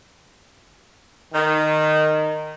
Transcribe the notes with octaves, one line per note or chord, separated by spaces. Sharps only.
D#3